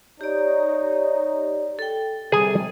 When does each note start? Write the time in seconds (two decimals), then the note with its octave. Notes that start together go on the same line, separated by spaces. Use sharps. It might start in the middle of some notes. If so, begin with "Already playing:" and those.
0.21 D#4 G4 C#5 D5
1.79 A4 G5
2.32 C3 G3 G#4 G#5